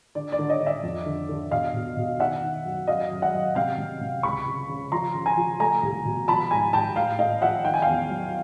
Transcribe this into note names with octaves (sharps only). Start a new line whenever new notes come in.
D3 D5
D5
D3
C#5 D#5
D3
D5 E5
F2
D3
D3
B2 D#5 F5
B2
B2
D#3 E5 F#5
D#3
F#2
F#2 D#5 F5
F#2
E5 F#5
F#3
C3 F5 G5
C3
C3
C#2 B5 C#6
C#2
C#3
F3 A#5 C6
C#3
G#5 A#5
F3
A3 G#5 A#5
C2
B2
F3 A5 B5
G#2 G#5 A#5
G#2 G5 A5
A2 F5 G5
A2 D#5 F5
F3 E5 F#5
D#3 G5
G#5
E2 F5 G5
F#3